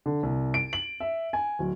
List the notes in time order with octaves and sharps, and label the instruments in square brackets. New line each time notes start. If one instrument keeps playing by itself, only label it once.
[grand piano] D3
C2
D7
F#7
E5
G#5
D1